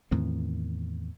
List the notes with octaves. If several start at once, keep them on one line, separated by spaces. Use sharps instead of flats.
E2 A2 D#3 C4